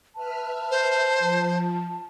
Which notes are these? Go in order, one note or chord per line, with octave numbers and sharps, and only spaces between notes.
B4 E5 A5 F6
C5
F3